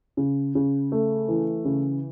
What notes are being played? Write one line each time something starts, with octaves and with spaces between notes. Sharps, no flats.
C#3
C#3
A3
E3
C#3